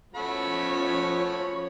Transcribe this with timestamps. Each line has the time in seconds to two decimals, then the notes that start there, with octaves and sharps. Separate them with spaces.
0.15 F3 A3 C#4 F#4 C#5 B5